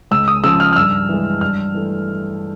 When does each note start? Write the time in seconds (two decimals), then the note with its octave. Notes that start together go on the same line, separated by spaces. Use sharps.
0.11 C#2 E6
0.28 D#6
0.44 C#3 F3 E6
0.60 F6
0.73 F6
0.76 G2 E6
1.09 E3 G#3
1.41 G2 F6
1.74 E3 A3